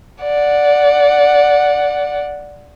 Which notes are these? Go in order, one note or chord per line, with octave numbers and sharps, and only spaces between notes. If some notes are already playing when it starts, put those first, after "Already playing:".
D5 F#5